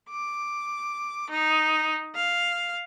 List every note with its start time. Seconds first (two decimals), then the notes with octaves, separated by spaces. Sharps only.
0.10 D6
1.30 D#4
2.16 F5